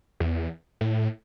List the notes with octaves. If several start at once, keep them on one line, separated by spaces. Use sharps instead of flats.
E2
A2